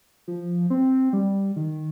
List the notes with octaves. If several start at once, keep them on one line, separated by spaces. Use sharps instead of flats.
F3
C4
G3
D#3